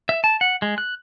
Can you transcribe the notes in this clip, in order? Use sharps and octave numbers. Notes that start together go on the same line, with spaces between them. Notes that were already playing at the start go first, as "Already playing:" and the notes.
E5
A5
F#5
G#3
F#6